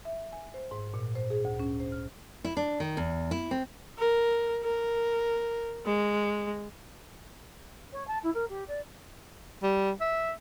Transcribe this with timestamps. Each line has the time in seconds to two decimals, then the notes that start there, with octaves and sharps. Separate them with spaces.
0.05 E5
0.33 G#5
0.54 C5
0.71 G#2
0.94 A#2
1.15 C5
1.30 G#4
1.45 D2
1.59 C#4
1.80 C5
1.92 F6
2.44 E4
2.57 D4
2.80 D#3
2.97 E2
3.31 E4
3.51 C4
3.98 A#4
4.63 A#4
5.86 G#3
7.93 C#5
8.08 A5
8.23 E4
8.34 A#4
8.49 G4
8.68 D5
9.63 G3
10.01 E5